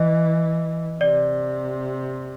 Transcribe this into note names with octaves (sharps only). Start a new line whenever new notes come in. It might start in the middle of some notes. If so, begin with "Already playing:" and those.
Already playing: E3 D#5
C3 D5